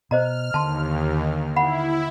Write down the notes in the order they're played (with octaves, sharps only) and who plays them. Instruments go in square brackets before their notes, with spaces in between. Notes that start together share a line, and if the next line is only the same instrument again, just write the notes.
[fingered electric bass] B2 [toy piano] C5 D#5 A#5 [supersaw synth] F6
[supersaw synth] D#2 [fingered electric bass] D3 [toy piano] A5 C6
[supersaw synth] E4 [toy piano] F#5 B5